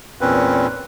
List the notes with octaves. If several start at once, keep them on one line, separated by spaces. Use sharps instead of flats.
E2 A#2 C4 C#4 B4